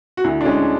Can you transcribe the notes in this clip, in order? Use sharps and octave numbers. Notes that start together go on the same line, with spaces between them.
F#4
D2 E4
D4
G#3 C#4